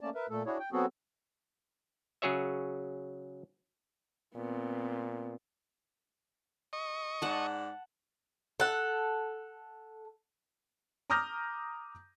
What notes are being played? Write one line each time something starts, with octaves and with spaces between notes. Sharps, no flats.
A3 A#3 C#4 D5 A5
A#4 B4 E5
A#2 A3 A4
D4 E4 F#4 G#4 C#5
G5
F#3 B3 C4 F#4 G#4 A4
C#3 F#3 G#4 C#5 E5
A#2 B3 C4
D#5 C#6
G#2 D5 F#5 A5
A4 F#5
A#5 D6 D#6 F6 G6 A#6